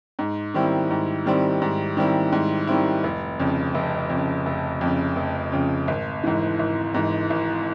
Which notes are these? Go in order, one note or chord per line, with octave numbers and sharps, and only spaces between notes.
G#2
D#3 G3 C4 E4
G#2
D#3 G3 C4 E4
G#2
D#3 G3 C4 E4
G#2
D#3 G3 C4 E4
F1
F2 C#3
F1
F2 C#3
F1
F2 C#3
F1
F2 C#3
G#1
G#2 E3
G#1
G#2 E3
G#1